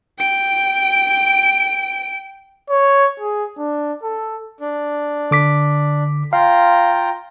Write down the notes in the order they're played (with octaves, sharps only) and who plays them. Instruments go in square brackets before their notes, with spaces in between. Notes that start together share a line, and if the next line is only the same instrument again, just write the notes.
[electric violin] G5 D7
[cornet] C#5
G#4
D4
A4
[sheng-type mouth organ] D4
[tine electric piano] D3 D6 B6
[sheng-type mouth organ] F4 G5 A#5 [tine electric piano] F5